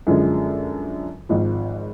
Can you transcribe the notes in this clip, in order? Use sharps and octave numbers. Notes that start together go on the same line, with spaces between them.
F#2 D3 F3 G#3
G#1 G#2 F3